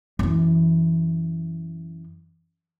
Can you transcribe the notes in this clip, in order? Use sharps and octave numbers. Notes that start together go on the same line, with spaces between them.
F#2 E3